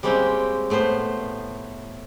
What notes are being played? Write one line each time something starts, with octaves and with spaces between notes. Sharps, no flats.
G3 G#3 A#3 C4 C#4 G4
A2 A3 B3 C5